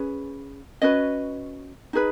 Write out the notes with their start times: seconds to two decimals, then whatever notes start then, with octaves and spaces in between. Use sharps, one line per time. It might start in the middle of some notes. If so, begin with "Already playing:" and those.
Already playing: C#4 G#4 B4
0.82 C#4 F#4 B4 D#5
1.93 D#4 G#4 B4